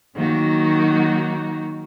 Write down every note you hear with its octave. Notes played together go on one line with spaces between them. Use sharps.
D#3 F#3 A#3 D#4 F#4